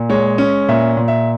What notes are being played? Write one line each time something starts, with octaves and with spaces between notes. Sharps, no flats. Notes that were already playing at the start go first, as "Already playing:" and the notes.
Already playing: A#2
G#3 C#5
C#4
A#2 E5
A#2
E5